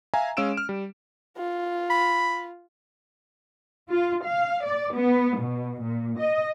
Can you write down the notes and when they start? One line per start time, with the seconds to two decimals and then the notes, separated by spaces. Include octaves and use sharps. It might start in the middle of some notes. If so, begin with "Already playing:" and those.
0.14 E5 F5 G#5 A#5
0.37 G#3 C#4 F5 E6 D7 E7
0.57 F6
0.69 G3
1.38 F4
1.90 B5
3.89 F4
4.24 F5
4.64 D5
4.94 B3
5.37 B2
5.82 A#2
6.18 D#5